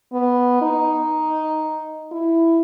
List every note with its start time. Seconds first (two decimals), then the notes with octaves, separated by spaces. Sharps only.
0.12 B3
0.62 D#4
2.12 E4